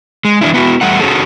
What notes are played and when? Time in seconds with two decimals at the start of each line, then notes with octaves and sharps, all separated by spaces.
0.25 G#3
0.41 E3 F3 D4 E4
0.54 B3 E4 F#4
0.81 E2 G3 A3 F#5
1.00 C#4 F#4 G#4 A4